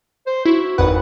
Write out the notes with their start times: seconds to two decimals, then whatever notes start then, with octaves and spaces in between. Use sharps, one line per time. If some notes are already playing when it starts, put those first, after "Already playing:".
0.27 C5
0.46 E4 F#4
0.78 G#1 F2 B4 F#5